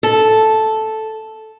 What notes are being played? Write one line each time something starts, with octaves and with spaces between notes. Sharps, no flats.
A4